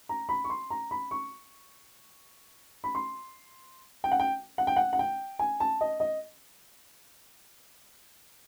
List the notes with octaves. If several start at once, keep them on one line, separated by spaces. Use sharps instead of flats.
A#5
B5
C#6
C6
A#5
B5
C#6
B5
C6
G5
F#5
G5
F#5
G5
F#5
F#5
G5
G#5
A5
D#5
D#5